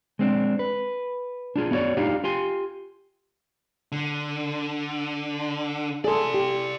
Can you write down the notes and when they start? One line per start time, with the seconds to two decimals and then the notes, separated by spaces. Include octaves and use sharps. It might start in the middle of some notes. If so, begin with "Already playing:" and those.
0.19 G#3 C4 D4
0.59 B4
1.56 D4 F4 G#4
1.71 B3 E4 F#4 C#5 D5
1.97 D4 D#4 F4 G4
2.24 F4 G4 G#5 C6
3.92 D3
6.04 G#4 A4 D5 C6
6.34 G4